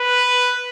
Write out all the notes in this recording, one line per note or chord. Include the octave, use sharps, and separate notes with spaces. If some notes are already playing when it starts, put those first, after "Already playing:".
Already playing: B4